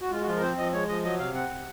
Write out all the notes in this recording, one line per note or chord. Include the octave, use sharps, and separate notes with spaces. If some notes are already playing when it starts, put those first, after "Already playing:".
F#4
G#3 F4
F#4
F3 F4
A#4
C4 C5
F3 D#5
G#3 C#5
F3 D#5
F#3 D#5
C3 F5
C4 F#5
C3